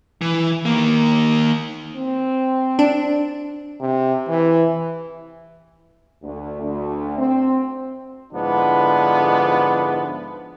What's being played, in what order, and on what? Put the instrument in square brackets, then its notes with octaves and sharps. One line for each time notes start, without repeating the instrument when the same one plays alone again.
[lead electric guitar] E3
D#3 A#3
[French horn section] C4
[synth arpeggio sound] D4
[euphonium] C3
E3
[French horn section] D2
D2
C4
[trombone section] G#2 D3 F3 B3 D4 E4